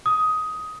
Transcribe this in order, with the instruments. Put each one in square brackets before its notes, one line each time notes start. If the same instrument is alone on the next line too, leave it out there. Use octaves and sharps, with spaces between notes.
[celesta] D#6